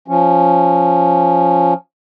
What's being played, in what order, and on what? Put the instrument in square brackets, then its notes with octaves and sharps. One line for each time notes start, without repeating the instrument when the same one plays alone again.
[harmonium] F3 C#4